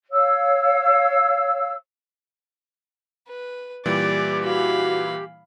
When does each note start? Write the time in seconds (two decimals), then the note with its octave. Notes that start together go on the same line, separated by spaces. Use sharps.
0.12 C#5 F5 E6
3.28 B4
3.85 A#2 E3 G3 G4 D5
4.44 F#4 F5 B5